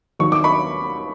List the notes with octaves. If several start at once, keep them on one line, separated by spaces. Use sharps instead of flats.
D#2 D#3 F#3 C#6
D6
B5 C#6